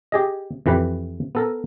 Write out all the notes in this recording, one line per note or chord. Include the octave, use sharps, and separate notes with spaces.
G4 G#4 D#5
F2 E3 G4 B4
B3 A4 A#4